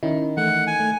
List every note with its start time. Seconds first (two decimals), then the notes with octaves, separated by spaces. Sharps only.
0.03 D#3 C#4 E4
0.37 E3 A3 F#5
0.67 G#5
0.80 A3